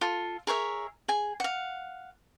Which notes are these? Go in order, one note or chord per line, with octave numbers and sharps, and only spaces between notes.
F4 A4
G#4 A#4 C#5 E5
G#4 G#5
F5 F#5